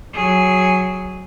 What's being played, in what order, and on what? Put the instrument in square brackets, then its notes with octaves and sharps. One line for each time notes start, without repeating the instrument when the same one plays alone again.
[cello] F#3 G#4